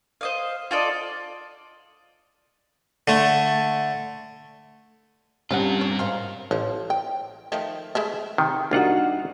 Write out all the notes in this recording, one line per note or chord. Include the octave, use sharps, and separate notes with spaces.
C5 D#5 F5
F4 A4 D5 D#5
D3 A3
G2 C3 C4 C#4 F4 A#4 C5 F#5
C#5
G#2 A#4 C5 F5
A1 F3
G5
D#3 F3 A3
G#3 A3 E4
C3 D#3
C2 D4 D#4 F4 F#4 F#5